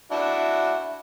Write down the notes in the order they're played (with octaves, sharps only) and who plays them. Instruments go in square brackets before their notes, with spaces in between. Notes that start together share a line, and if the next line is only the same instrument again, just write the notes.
[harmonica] D4 E4 F#4